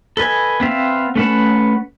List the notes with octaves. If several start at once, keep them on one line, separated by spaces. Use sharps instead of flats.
A4 B4 D#5 G#5
B3 C4 E5 F5
A3 C#4 B4 F#5 A5